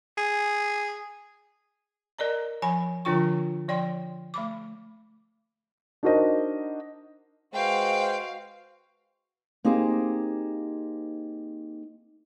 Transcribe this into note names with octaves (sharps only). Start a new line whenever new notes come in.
G#4
A#4 D5 D#5 A#5
F3 G#5 B5
D3 F3 D4 F4 G5 C#6
F3 D5 G5 C6
A3 B5 D6
D4 D#4 F#4 A#4 C5 D#5
G#3 F#4 B4 C5 F5 G5
A#3 C4 D#4 G4 G#4 C5